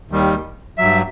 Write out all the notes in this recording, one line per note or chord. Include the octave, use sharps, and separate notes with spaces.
D#2 D#3 G3
G2 F#3 E5